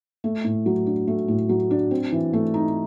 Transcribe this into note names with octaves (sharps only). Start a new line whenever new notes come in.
A3
A2
F#3
D4
A3
A2
F#3
D4
C4
E3
A3
D#4